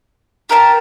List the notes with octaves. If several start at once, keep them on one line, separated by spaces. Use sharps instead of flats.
G4 A#4 E5 A5